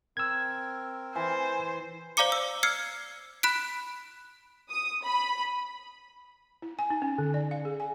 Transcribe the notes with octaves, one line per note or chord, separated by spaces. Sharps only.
C4 A#4 E6 G#6
E3 C5 G#5
C5 D5 F5 A#5 D6 C#7
E6
E6 F6 G#6 C7 C#7
B5 F#6 B6 D7
D#6
B5
E4
G#5
D#4
C#4
D3
D5
F5
G#4
G#5